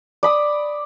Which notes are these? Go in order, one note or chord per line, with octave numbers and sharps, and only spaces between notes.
D5 B5 D#6